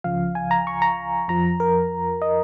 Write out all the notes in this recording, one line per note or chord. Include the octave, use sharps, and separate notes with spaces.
C#2 C#3 F3 F5
G#5
A#5
C#6
A#5
F2 F3 A#5
A#4
D#5